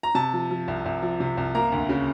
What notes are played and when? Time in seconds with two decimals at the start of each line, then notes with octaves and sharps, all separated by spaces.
0.03 A#5
0.15 C3 A5
0.33 F3
0.51 F3
0.68 C2
0.85 C2
1.02 F3
1.20 C3
1.37 C2
1.55 A#3 A#5
1.72 D2
1.89 C#3